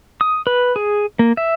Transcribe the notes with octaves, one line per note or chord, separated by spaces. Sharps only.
D#6
B4
G#4
A#3
E5